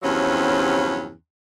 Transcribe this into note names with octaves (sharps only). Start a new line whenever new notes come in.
E2 G2 C3 F3 F#3 C#4